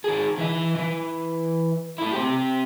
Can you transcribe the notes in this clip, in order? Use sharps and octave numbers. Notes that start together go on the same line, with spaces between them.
D#3 G#4
E3 E5
E3
A3 E4
C4 G4